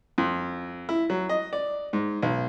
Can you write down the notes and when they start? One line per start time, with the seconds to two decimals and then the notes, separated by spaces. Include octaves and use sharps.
0.18 F2
0.89 E4
1.10 F#3
1.29 D#5
1.53 D5
1.93 G#2
2.23 B1